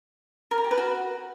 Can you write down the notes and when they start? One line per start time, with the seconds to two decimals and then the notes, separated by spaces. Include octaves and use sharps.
0.51 A#4
0.58 A#5
0.64 G4
0.71 B4
0.78 F#4